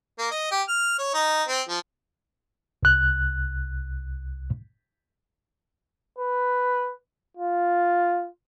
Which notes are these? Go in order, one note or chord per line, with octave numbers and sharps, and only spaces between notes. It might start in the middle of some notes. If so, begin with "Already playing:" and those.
A#3
D#5
G4
F6
C#5
D#4
C4
F3
C2 F#6
B4
F4